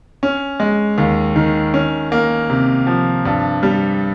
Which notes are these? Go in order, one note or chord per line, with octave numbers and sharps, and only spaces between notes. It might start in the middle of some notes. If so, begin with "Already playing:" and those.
C#4
G#3
D#2
D#3
C#4
A#3
C3
F3
G2
G3